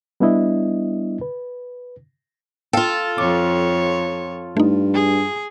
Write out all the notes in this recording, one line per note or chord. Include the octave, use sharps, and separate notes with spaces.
G3 B3 D4 E4 D#5
B4
F4 A4 F5 G5
F2 C#5 D6
G2 A3 D#4
G#4